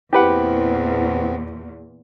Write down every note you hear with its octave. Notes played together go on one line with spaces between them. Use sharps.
E2 A#2 B3 C4 E4 G4 B4 F#5